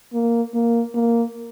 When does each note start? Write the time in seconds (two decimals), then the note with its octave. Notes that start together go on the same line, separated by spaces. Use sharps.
0.13 A#3
0.54 A#3
0.95 A#3